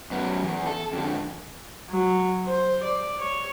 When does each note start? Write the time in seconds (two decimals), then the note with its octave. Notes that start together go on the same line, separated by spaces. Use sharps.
0.11 F#2 B3
0.43 E2
0.66 A4
0.93 F2 D3
1.90 F#3
2.47 C5
2.84 D5
3.20 C#5